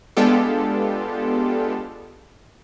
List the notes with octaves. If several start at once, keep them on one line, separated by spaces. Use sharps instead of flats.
G#3 B3 D4 F4 G4 A4